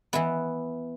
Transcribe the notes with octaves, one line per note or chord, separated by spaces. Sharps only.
E3 B3 E4